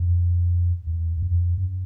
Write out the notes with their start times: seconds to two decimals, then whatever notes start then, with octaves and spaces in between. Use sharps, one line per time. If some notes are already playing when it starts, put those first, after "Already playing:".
Already playing: F2
0.87 E2
1.17 E2
1.22 F2
1.57 F#2